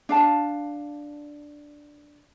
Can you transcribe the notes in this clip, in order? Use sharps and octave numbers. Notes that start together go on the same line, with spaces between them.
D4 F5 A5